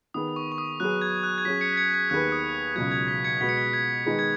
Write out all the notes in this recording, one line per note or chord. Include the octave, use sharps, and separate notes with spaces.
D#3 B3 G#4 D#6
C#6
C#6
D#6
F#3 B3 G#4 F#6
G#6
F#6
G#6
F#3 C#4 G#4 B6
G#6 C#7
B6
G#6 C#7
G#6
D#2 D#3 B3 G#4 B4 F#6
D#6
C#2 B2 F#3 G#6
G#6
B6
G#6 C#7
B2 G#3 B3 F#4 B6
C#7
B6
G#6
D#3 G#3 B3 D#4 G#4
G#6